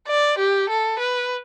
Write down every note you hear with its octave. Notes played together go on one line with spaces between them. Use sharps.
D5
G4
A4
B4